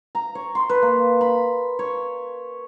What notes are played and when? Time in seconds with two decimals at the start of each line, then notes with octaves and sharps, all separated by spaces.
0.15 A#5
0.35 C#5
0.55 C6
0.70 B4
0.82 A#3
1.21 B5
1.79 C#5